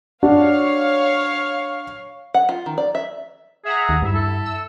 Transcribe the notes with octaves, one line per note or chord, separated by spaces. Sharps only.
D4 F#4 C#5 F5
F#5
F4
D#3
D5
E5
G#4 E5 F#5 A#5
D#2
G2 E4 E5
A4
E6